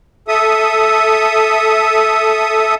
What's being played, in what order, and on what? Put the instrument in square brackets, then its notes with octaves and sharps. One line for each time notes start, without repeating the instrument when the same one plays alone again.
[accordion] A4 E5 D#6